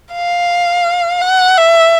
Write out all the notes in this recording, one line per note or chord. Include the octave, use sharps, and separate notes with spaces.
F5
F#5
E5